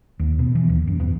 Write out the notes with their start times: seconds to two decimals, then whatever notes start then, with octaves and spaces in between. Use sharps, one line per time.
0.19 D#2
0.39 B2
0.55 E3
0.69 D#2
0.87 F#2
1.00 E2